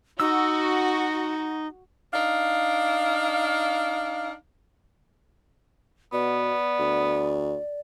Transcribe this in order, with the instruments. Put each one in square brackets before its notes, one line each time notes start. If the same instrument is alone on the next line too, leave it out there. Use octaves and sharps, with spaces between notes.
[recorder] D#4 [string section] F#4 [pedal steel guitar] E6
[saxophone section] D4 D#4 F5
[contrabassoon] B2 [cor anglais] B3 [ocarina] D5
[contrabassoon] D2